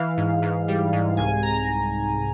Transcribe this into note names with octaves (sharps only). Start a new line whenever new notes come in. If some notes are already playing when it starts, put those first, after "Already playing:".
Already playing: E3 F5
G#2
G#2
G3
G#2
C2 G#5
A#5